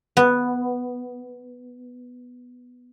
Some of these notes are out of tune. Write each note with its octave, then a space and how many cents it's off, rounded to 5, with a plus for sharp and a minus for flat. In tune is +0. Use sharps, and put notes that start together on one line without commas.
B3 +0